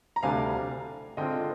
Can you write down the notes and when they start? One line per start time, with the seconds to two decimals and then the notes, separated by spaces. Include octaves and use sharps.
0.16 A#5
0.23 D2 C3 G3 D4 F5 G#5
1.17 D3 G#3 C4 F4 D#5 G5